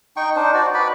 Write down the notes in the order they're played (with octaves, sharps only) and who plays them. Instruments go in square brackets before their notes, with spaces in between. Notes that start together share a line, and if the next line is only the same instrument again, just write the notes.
[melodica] D#4 G5 C#6
D4 D#4 C5
F#4 D5
B4 D5 B5